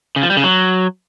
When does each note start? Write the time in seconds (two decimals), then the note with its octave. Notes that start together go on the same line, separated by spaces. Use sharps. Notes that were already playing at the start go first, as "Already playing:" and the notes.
0.16 C#3
0.23 F3
0.30 G3
0.37 C#3
0.44 F#3